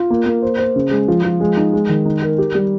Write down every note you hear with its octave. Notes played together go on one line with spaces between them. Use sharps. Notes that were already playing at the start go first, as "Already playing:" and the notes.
Already playing: F4
A#3
A#3
C5
C5
C#3
G#3
F3
F3
G#3
D#4
G#3
D#3
D#4
A#4
G4
G3